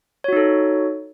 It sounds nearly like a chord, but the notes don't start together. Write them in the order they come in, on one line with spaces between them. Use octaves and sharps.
C#5 F#4 D#4 A4